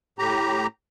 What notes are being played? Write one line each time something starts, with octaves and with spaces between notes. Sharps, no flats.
A2 G4 A#5